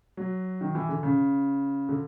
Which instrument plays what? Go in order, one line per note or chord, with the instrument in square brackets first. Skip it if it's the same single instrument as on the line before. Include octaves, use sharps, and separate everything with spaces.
[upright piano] F#3
D#3
E3
D3
C#3
D3